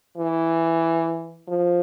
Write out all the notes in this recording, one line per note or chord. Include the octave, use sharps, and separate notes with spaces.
E3
F3